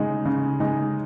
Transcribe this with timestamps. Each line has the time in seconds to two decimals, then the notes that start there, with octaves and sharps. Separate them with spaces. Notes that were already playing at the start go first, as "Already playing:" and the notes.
Already playing: C#3 G#3 D#4
0.25 C#3
0.60 G#3 D#4